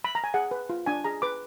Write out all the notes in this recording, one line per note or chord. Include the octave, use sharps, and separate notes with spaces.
B5
A#5
G#5
G#4 F#5
B4
F4
D4 G#5
G#4 A#5
B4 D6